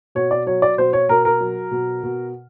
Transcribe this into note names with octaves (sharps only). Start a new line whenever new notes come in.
B2 C#5
D5
F#3 C#5
D5
B2 C5
C#5
B2 A#4
A#4
F#3
B2
B2